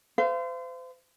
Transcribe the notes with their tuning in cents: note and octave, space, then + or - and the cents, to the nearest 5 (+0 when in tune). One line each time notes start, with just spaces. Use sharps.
C5 -35 F5 -40